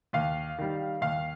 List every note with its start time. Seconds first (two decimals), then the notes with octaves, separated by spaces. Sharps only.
0.13 D#2 F5
0.58 D#3 G3
1.01 D#2 F5